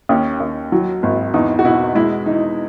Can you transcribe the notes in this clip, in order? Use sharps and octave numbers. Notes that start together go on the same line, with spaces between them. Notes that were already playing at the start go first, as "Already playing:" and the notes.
D#2 C#4
D#2
F#3
G#1
E2 D#4
F#4
B2 E4
G#3 E4
E3 D#4